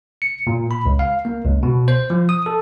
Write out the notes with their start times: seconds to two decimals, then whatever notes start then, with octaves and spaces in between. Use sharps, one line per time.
0.22 C#7
0.47 A#2
0.71 B5
0.86 C#2
0.99 F5
1.25 A#3
1.45 C#2
1.63 B2
1.88 C5
2.10 F3
2.29 D#6
2.46 A4